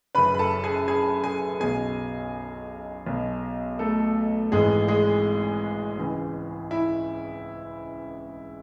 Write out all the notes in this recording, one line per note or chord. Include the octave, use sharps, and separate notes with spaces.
F#1 F#2 C#3 B4 B5
B5
A4 A5
G#4 G#5
G#4 G#5
G#4 G#5
B1 B2 G#4 G#5
B1 B2
A3 A4
G#1 G#2 E3 G#3 G#4
G#3 G#4
C#2 C#3 E3
E4